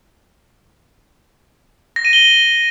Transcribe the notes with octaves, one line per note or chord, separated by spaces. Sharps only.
A#6
D#7
G7